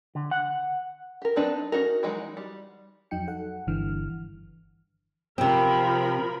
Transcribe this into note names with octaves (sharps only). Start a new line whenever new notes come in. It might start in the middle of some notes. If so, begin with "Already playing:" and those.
D3
F#5
G4 A#4
F#3 C4 D4 D#4 B4
C#4 D#4 F#4 A#4
E3 F#3 G#3 D#4 F#4
G3
F2 F#3 D#4 G5 C#7
A4 F#5
G1 G2 D3 E3 F6
C3 F3 C4 A#4 B5